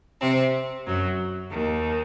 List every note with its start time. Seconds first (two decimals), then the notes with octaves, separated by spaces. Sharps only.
0.21 C3 C4
0.86 F#2 F#3
1.49 D#2 D#3